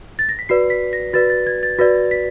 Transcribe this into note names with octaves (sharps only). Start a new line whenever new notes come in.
A6
A#6
B6
F#4 B4 D5 C7
B6
A#6
F#4 B4 D5 A6
A6
G#6
A6
F#4 B4 D5 A#6
B6